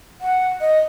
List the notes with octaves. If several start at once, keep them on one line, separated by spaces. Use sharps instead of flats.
F#5
D#5